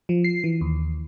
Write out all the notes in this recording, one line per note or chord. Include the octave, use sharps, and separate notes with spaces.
F3
C7
E3
D#2